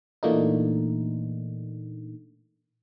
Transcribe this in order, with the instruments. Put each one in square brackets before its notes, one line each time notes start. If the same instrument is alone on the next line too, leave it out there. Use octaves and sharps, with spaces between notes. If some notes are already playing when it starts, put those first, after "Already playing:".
[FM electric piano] A#2 E3 A3 A#3 D4 D#4